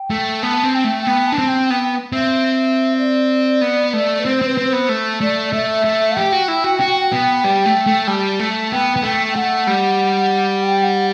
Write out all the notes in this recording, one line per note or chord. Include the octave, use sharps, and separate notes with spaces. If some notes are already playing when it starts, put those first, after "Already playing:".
Already playing: G5
A3
B3 A5
C4
G5
A3
B3 G5
D4 A5
C4
G5
B3 G5
C4 E5
D5
B3
A3
B4
C4 C5
C4 B4
C4
C5
B3
A3
A3 D5
A3 E5
A3
G4 G5
F#4
E4
F#4
F#4
B3
G3
A3
A3
G3 A5
A3
B3 G5
B3
A3 G5
A3 F#5
G3
G5
F#5